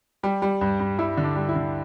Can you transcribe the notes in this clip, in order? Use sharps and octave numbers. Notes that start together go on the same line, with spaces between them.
G3 G4
G3
G2
G2
G3 E4
D3
D4
G3
E4
D3